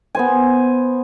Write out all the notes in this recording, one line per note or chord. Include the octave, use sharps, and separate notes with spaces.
B3 C5 G#5